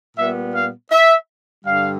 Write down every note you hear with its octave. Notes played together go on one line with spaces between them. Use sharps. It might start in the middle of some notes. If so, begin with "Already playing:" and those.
A#2 G3 B3 E5
F5
E5
G2 D3 G3 F5